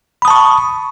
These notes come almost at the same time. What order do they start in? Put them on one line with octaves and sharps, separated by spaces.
B5 D#6 A5 C#6